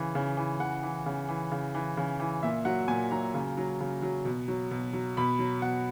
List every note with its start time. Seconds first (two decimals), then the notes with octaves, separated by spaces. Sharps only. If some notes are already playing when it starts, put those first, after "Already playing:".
Already playing: C#3 E3
0.15 C#3
0.37 E3
0.60 C#3 F#5
0.83 E3
1.06 C#3
1.29 E3
1.52 C#3
1.74 E3
1.97 C#3
2.20 E3
2.43 A#2 E5
2.65 F#3 F#5
2.88 A#2 G#5
3.11 F#3 A#5
3.34 C#3
3.57 F#3
3.80 C#3
4.02 F#3
4.25 B2
4.48 F#3
4.71 B2
4.93 F#3
5.17 B2 B5
5.39 F#3
5.62 B2 F#5